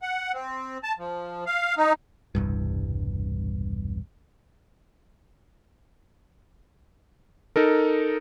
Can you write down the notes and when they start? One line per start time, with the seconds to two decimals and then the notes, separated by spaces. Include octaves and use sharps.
0.02 F#5
0.34 C4
0.83 A5
0.99 F3
1.46 F5
1.77 D#4
2.35 E1 C2 G2
7.56 D#4 A4 A#4